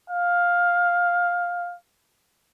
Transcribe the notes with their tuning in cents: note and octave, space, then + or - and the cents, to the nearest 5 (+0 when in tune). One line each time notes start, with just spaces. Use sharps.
F5 +10